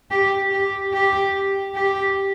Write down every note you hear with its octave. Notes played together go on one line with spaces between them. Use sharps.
G4
G4
G4
G4